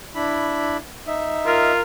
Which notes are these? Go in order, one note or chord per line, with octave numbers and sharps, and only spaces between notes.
D4 E4 B5
D#4 E5
F4 A#4